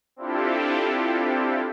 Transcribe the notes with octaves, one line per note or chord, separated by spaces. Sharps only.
C4 D4 E4 F4 G4 A4